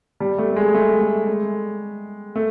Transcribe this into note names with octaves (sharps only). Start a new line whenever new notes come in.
G3
A3
A3
G#3
A3
A3
G#3
A3